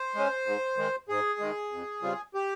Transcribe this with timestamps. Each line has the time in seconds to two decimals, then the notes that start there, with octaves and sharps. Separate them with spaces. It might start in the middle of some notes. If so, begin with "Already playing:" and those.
Already playing: C5
0.15 G#3 C#4
0.46 G#2
0.77 D#3 G#3
1.09 G#2 G#4
1.39 D#3 G#3
1.72 F2
2.02 C#3 G3 C4 F4
2.34 G4